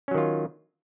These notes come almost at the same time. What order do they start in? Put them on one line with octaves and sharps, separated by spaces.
C#4 F#3 D#3 F4